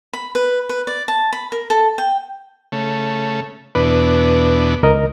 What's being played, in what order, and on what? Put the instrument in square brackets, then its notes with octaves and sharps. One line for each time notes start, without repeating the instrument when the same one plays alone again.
[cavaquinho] B5
B4
B4
D5
A5
B5
A#4
A4
G5
[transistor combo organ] C#3 A3
[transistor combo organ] E2 B2 D4 [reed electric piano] B4
[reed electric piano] C#2 A#4 D#5